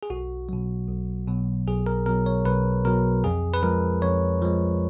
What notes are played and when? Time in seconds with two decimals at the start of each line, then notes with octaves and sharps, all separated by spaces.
0.03 G#4
0.10 B1 F#4
0.49 B2 F#3
0.89 B1
1.28 B2 F#3
1.67 B1 G#4
1.86 A#4
2.06 B2 F#3 A#4
2.26 C#5
2.45 B1 B4
2.85 B2 F#3 A#4
3.24 F2 G#4
3.54 B4
3.63 F3 G#3 A#4
4.02 F2 C#5
4.42 F3 G#3